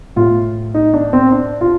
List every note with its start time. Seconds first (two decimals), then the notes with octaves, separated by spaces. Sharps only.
0.16 A2 A3 F4
0.74 D#4
0.94 D4
1.13 C4
1.32 D4
1.61 F4